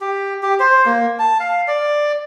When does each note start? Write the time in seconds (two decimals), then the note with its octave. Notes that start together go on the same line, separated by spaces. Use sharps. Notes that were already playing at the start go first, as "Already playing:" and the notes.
0.01 G4
0.43 G4
0.60 C5
0.86 A#3
1.19 A5
1.40 F5
1.68 D5